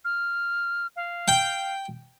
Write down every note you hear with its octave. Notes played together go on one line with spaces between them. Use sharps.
F6
F5
G5